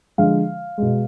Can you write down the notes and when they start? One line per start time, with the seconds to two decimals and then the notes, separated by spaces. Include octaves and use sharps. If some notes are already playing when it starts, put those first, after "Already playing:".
0.18 D3 F3 G#3 F5
0.78 B2 G#3